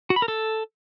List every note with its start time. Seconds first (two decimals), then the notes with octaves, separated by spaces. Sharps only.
0.10 F#4
0.16 B5
0.22 A#4
0.28 A4